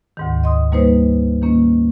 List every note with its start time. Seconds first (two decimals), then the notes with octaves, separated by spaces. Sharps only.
0.17 D2 G#2 D#3
0.44 D#5 C6 D#6
0.72 G3 A#3 D#4 B4 C5
1.42 D#3 A#3 C#4